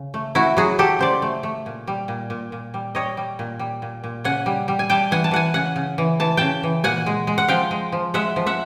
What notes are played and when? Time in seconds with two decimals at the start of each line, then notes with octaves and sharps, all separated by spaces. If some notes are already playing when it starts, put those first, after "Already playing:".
Already playing: C#3
0.14 A3
0.35 A3 E4 F#4
0.57 F#3 F#4 G#4
0.78 F#3 G4 A4
0.99 C#3 C5 D5
1.22 A3
1.43 A3
1.66 A#2
1.87 G3
2.08 A#2
2.30 A#2
2.52 A#2
2.74 G3
2.95 G3 C#5 D#5
3.17 G3
3.39 A#2
3.59 G3
3.82 A#2
4.04 A#2
4.24 C#3 F#5 G#5
4.46 G3
4.68 G3
4.79 G#5
4.90 G3 G5 A5
5.11 E3 F#5 G#5
5.24 A5
5.31 E3 F#5 G#5
5.54 C#3 F#5 G#5
5.76 C#3
5.98 E3
6.20 E3 A5
6.37 C#3 G5 A5
6.63 E3
6.84 A#2 F#5 G#5
7.06 G#3
7.27 G#3
7.38 F#5
7.48 F3 F5 G5
7.71 G#3
7.92 F3
8.14 G#3 E5 F#5
8.36 F3
8.46 E5 F#5